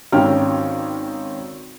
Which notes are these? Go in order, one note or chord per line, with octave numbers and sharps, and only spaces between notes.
G#1 D#3 C#4 G5 F6